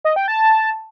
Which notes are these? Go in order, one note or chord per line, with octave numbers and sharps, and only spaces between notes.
D#5
G5
A5